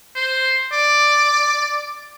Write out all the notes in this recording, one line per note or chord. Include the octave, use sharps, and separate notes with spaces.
C5
D5